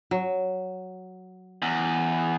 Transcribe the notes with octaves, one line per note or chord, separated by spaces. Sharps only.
F#3
E2